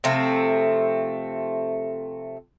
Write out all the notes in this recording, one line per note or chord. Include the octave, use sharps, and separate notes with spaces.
C3 F3 A3 C4